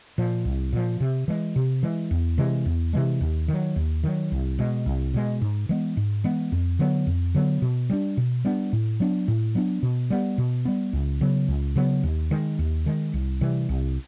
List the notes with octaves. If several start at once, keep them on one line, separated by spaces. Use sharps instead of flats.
A#2 F3
C2
A#2 F3
C3
E3 G#3
C3
E3 G#3
E2
C3 E3 G#3
E2
C3 E3 G#3
D#2
D#3 F#3
D#2
D#3 F#3
C2
B2 G#3
C2
B2 G#3
G#2
E3 G#3 B3
G#2
E3 G#3 B3
F2
D3 F#3 B3
F2
D3 F#3 B3
B2
G3 B3 D4
B2
G3 B3 D4
A2
F#3 B3 D4
A2
F#3 B3 D4
B2
G3 B3
B2
G3 B3
C#2
C#3 F#3 B3
C#2
C#3 F#3 B3
D#2
D#3 G#3
D#2
D#3 G#3
C2
C3 E3 G3
C2